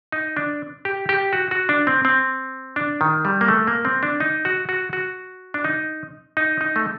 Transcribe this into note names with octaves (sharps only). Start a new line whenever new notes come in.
D#4
D4
G4
G4
F#4
F#4
D4
C4
C4
D4
D#3
G3
A#3
A3
A#3
C4
D4
D#4
F#4
F#4
F#4
D4
D#4
D#4
D#4
A3